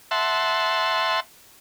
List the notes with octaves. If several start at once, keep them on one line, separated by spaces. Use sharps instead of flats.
E5 F#5 A5 C6